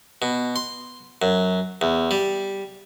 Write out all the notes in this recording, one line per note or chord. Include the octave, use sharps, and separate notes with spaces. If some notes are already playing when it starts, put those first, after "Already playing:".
B2
C6
F#2
E2
G3